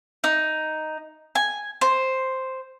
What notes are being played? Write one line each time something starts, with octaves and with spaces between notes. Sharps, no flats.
D#4
G#5
C5